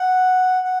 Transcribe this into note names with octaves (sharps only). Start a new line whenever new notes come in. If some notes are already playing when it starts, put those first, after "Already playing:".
Already playing: F#5
F#5